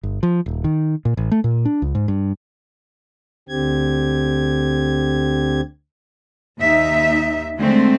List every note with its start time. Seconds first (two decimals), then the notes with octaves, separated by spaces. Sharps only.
0.03 G1
0.23 F3
0.46 D#1
0.64 D#3
1.05 A#2
1.17 A1
1.31 A3
1.44 A#2
1.65 D4
1.82 C#2
1.95 G#2
2.08 G2
3.49 D2 D3 C4 G4 G#6
6.61 D#2 D#4 E5
7.58 D3 G#3 A3 C4